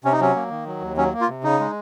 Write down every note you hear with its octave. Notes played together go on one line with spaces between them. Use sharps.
C3 C#4
D#4
F#3 C#4
A#3
D#3
F#3
D#2
F#3 C#4
A#3
F4
C3
C#3 D#4
G#3